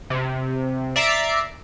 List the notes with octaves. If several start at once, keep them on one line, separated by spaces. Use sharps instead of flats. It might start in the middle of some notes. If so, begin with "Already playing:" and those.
C3
D5 E5 A#5 C7 D7